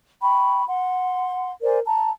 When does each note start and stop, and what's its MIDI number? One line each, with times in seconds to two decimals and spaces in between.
0.22 0.63 79
0.22 0.63 83
0.22 0.63 85
0.69 1.50 78
0.69 1.50 84
1.63 1.79 70
1.63 1.79 72
1.63 1.79 74
1.63 1.79 80
1.85 2.10 81
1.85 2.10 82